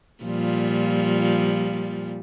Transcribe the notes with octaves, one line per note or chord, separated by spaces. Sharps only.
A#2 F3 G3